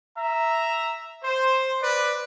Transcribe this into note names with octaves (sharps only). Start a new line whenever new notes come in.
E5 A#5
C5
B4 D5